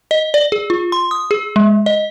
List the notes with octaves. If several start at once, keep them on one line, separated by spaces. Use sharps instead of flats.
D#5
D5
G#4
F4
C6
D#6
G#4
G#3
D#5